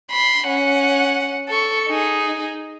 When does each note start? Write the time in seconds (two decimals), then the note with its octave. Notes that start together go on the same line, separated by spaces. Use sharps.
0.11 B5 C6
0.47 C#4 F#5
1.48 A4 C#6
1.89 D#4 G#4